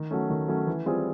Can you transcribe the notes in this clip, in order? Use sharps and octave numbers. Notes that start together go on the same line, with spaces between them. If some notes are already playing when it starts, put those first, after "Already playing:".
Already playing: D#3
F#3 A3 C#4
D#3
F#3 A3 C#4
E3
G3 C4 F4 G#4